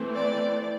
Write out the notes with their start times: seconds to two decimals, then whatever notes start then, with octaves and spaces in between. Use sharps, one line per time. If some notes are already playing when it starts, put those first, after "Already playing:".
Already playing: E3 A3 C4
0.14 D5